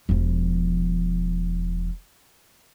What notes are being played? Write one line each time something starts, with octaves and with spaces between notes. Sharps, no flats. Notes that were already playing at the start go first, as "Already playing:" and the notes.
E1 F3